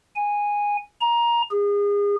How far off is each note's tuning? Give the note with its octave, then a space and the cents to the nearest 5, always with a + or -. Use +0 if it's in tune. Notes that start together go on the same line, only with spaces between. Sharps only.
G#5 -10
A#5 +15
G#4 -35